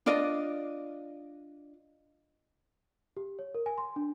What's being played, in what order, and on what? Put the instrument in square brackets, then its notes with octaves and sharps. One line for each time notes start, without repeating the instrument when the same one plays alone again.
[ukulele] D4 F4 D5 D#5
[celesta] G4
C#5
A#4
G#5
C6
D4